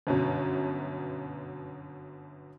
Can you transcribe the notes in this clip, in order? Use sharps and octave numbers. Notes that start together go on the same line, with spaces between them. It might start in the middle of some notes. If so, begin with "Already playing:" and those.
G1 F#2 B2